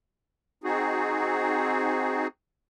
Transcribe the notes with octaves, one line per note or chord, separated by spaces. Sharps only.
C4 D#4 F#4 G#4